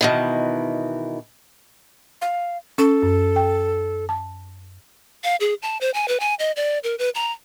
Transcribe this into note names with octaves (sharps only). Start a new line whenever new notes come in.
B2 D#3 E3
F5
C#4 A4
F#2
G5
A5
F5
G#4
A5
C5
G#5
B4
G#5
D#5
D5
A#4
B4
A#5